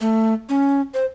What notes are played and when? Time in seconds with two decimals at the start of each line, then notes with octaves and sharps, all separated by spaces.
0.01 A3
0.49 C#4
0.94 C5